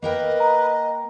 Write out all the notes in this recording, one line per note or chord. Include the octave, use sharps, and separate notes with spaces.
A#3 A#4 B4 D#5 G5
A#5